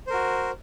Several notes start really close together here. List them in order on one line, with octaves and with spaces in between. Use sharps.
C5 A#4 F#4